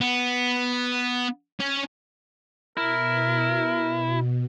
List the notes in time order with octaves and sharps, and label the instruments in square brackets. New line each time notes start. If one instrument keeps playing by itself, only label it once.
[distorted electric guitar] B3
C#4 C#5
[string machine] B2 [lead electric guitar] E4 [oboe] A#4